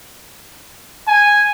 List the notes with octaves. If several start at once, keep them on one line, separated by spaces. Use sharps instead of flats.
G#5